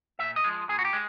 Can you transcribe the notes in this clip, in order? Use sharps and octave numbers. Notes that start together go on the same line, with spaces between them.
A#2 E5
D#5
F3 G#3
A#2 G#4
F#4
G4
G#3